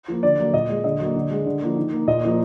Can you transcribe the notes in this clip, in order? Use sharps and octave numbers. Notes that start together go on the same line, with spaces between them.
F3 A#3
D3 D5
F#3 A#3
A#2 D#5
G#3
D3 D#5
F#3 A#3
D3
G#3
D3
F3 A#3
D#3
A#3
A#2 D#5
F3 A#3